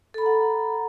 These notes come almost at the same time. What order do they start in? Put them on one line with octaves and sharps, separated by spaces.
A4 B5 A#5 F#5